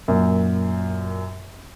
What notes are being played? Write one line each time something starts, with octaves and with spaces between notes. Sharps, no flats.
F#2 A#2